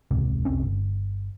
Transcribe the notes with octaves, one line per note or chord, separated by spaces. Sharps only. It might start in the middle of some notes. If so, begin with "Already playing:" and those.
E1 C#2 G#2 C3
F1 C2 C4 C#4
G1